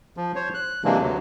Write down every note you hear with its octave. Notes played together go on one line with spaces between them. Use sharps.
F3
C5 C#5
F#6
C3 E3 F#3 G#3 A#3 D4
D2 F#3